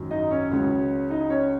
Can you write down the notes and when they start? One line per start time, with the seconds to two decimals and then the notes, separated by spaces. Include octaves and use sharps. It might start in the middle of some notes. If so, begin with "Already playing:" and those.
Already playing: G#1 F#2 D#3 F#3
0.11 D#4 D#5
0.31 C#4 C#5
0.52 C#2 C#3 F#3
1.10 D#4 D#5
1.30 C#4 C#5